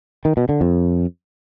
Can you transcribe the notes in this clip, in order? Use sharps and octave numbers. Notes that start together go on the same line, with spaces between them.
D#3
B2
D3
F2